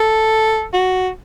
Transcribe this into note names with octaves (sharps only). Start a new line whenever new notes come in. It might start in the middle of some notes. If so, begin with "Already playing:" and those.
Already playing: A4
F#4